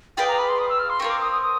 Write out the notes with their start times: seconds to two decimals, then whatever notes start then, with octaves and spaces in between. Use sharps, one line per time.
0.17 F4 G#4 B4 D5 G5
0.28 A#5
0.38 B5
0.49 C6
0.59 D#6
0.69 E6
0.80 F6
0.90 C6
1.00 C4 F4 A#4 C#6
1.10 D6
1.21 D#6
1.32 D#6
1.42 D#6